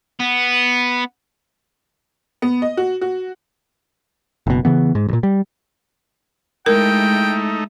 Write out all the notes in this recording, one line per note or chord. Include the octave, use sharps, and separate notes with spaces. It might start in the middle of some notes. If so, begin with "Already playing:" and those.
B3
B3
D#5
F#4
F#4
F#1 B2
C#3 E3 B3
G#2
A1 A#2
G3
G#3 A3 D#4 E4 A#4 G5